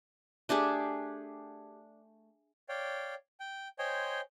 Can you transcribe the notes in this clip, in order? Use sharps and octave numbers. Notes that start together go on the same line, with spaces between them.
A3 D4 G4 G#4
C#5 D5 F5 G5
G5
C5 C#5 D#5 G5 G#5 C6